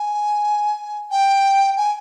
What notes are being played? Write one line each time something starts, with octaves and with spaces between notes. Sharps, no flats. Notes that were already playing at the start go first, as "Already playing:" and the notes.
Already playing: G#5
G5
G#5